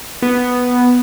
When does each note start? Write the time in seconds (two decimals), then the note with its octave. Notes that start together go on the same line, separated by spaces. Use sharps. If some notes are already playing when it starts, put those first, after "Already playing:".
0.22 B3